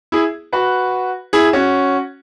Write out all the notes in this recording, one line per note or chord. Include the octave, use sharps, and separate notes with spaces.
E4 G#4
F#4 B4
E4 G#4
C#4 F#4